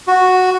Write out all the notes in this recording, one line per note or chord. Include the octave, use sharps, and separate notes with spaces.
F#4